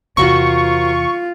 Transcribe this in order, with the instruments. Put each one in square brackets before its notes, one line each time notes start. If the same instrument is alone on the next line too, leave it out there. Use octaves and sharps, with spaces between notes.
[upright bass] E2 C3 [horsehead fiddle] F4 [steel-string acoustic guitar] F#4 A#4 C5 [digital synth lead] C#6